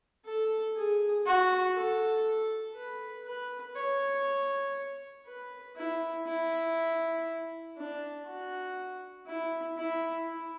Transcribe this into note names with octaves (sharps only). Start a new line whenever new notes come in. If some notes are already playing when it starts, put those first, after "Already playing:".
A4
G#4
F#4
A4
B4
B4
C#5
B4
E4
E4
D4
F#4
E4
E4
E4